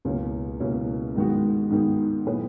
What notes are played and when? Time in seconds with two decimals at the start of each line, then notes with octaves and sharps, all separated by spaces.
0.05 C#2 B2 A#3 C#4 E4
0.60 C#2 B2 A#3 C#4 E4
1.16 G#2 D#3 G#3 B3 F#4
1.70 G#2 D#3 G#3 B3 F#4
2.26 A#2 F#3 B3 E4 B4